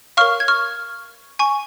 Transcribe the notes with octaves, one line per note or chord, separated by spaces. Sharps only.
A#4 C#5 F5 C#6 F6
G#6
C#6 F6
G#5 C#6